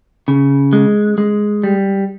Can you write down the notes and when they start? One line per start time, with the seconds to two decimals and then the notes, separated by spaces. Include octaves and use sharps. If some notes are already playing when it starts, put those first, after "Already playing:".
0.28 C#3
0.73 G#3
1.18 G#3
1.64 G3